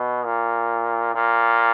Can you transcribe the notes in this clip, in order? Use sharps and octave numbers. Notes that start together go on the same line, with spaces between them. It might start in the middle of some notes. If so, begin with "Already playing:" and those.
Already playing: B2
A#2
A#2